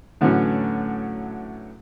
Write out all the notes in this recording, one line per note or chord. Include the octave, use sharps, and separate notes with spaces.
A2 D3 E3 F#3 A3 C#4